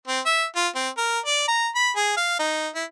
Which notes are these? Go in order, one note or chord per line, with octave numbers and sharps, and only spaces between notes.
C4
E5
F4
C4
A#4
D5
A#5
B5
G#4
F5
D#4
E4